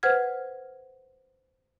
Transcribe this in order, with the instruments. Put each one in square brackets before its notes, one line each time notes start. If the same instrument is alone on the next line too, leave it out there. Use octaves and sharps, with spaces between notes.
[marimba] B4 C5 F#5 F6 G#6